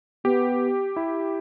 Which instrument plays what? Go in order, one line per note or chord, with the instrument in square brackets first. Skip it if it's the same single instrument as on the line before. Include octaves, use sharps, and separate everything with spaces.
[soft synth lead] B3 [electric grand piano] G4
[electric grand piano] E4